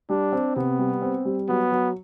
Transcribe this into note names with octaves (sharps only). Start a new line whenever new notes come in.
G3 D4
C4
C3 B3
G3
C4
G3
F#3 B3
F#3